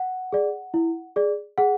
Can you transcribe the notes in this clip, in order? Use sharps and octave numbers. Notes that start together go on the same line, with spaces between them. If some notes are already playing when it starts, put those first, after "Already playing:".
Already playing: F#5
G#4 D5
E4
G#4 D5
G#4 F#5